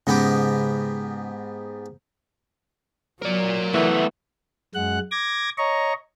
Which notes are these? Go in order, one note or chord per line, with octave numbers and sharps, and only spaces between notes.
G#2 C#3 B3 G4
F#3 A#4 D5
E3 A3 B3
F#2 G#3 F#5 F#6
D6 G#6 A#6
C#5 D#5 A#5 C#6